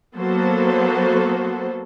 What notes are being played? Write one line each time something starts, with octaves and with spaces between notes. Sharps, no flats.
F#3 A#3 B3 F#4 A4 C5